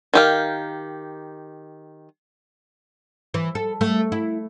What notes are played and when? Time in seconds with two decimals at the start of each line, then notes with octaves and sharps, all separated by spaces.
0.14 D#3 G4 F5
3.34 E3
3.55 A4
3.81 A3
4.12 E4